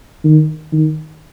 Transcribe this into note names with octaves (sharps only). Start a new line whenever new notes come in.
D#3
D#3